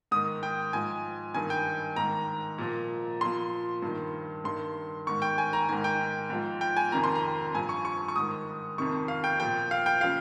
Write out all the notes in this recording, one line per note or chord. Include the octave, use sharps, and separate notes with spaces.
G#2 D#3 D#6
G5
G#2 F3 G#5
G2 D#3 G#5
G5
G#2 D#3 A#5
A#2 F3
A#2 F3 C6
G2 D#3
G2 D#3 C6
G#2 D#3 C#6
G5
G#5
A#5
G#2 D#3 G#5
G5
G#2 F3
G5
G#5
F2 C3 D#3 A#5
C6
A#5
G2 F3 G#5
C#6
C#6
C#6
G#2 D#3 D#6
F2 C3 D#3 C#6
F5
G5
A#2 F3 G5
F5
G5
C#3 F3 F5